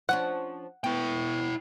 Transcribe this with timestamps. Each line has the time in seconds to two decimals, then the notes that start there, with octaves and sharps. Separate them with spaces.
0.09 F3 C#4 D4 F#5
0.84 B3 E4 G5